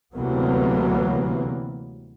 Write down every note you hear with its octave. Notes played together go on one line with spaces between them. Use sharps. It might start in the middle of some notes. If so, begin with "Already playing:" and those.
D2 C3 E3 F#3 A#3 B3